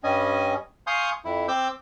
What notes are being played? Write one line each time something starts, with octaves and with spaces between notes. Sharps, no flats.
G2 G3 C#4 D#5 G#5
F5 G#5 C6 C#6 D#6 G6
F2 E4
C4 D6 E6 G6